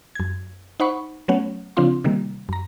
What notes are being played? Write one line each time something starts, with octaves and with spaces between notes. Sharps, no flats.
F#2 G#6
D#4 C5 F#5 B5 C#6
F#3 A3 B3 C#4 C#5 F#5
C#3 F3 C4 D4 F4 C6
C3 D#3 G3 A#3
F#2 A#5